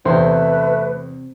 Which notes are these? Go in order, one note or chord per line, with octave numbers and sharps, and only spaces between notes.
E2 C3 A3 C4 B4 C5 C6